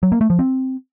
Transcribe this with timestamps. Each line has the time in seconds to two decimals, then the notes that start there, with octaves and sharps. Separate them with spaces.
0.03 F#3
0.12 A#3
0.21 A3
0.30 F3
0.39 C4